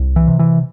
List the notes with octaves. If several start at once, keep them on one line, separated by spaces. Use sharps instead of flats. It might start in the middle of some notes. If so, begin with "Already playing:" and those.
Already playing: C2
E3
C3
E3